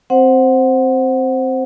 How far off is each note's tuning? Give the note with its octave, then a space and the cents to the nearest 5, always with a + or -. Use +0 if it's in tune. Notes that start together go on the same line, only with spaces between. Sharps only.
C4 +0 C5 +0 F#5 +0